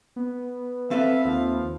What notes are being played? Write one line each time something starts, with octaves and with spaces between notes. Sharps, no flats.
B3
C4 A4 B4 E5 F5
D#2 F3